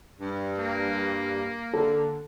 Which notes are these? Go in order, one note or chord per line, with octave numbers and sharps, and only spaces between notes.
G2
A#3
D3 A4